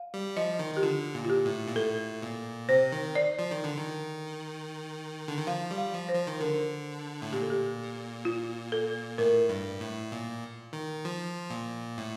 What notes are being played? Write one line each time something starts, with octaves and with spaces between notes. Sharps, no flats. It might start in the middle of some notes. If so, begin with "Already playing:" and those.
Already playing: F5
G3
F3 D#5
D#3
D#3 G4
D3 F4
A#2
F4
G4
A2
A#2
A2 A4
A#2
C3 C5
D#3
D5
F3
D#3
D3
D#3
D3
D#3
F3 F5
G3
F5
F3
C5
F3
D#3
D3 A#4
A2
A#2 G4
A4
G4
F4
A4
A2 A#4
G2
A2
A#2
D#3
F3
A#2
A2